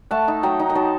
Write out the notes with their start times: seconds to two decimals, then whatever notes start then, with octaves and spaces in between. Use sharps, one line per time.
0.11 A3 F#5 A5
0.28 D#4
0.43 F#3 G5 A#5
0.59 D#4
0.70 A#5
0.75 F#3 A5 C6